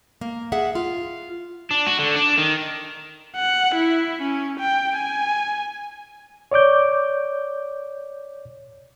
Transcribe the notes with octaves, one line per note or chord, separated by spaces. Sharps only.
A#3
G#4 E5 F#5
F4
D4
F#4
D3
D4
D#3
F#5
E4
C#4
G5
G#5
C#5 D5 D6 G6